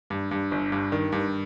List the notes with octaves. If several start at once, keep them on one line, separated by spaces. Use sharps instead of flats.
G2
G2
G1
G2
D#3
G2